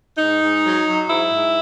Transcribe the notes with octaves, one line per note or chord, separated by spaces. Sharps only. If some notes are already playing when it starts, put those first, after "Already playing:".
G#2 D#4
G#2
F#3
F#3
G#2 E4
G#2